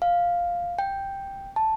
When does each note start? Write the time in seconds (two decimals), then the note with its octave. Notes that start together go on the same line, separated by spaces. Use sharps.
0.02 F5
0.79 G5
1.56 A5